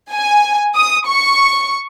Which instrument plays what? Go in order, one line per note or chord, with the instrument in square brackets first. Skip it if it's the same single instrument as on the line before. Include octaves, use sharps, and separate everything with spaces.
[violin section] G#5
D#6
C#6